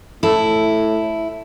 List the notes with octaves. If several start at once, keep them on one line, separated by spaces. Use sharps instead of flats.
A2 E4 A4 A5 E6